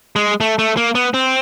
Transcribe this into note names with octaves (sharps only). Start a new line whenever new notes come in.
G#3
A3
A3
A#3
B3
C4